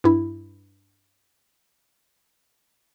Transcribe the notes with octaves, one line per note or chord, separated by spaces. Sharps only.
G2 E4